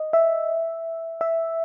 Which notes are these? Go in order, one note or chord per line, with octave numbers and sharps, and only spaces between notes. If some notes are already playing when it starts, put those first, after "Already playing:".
Already playing: D#5
E5
E5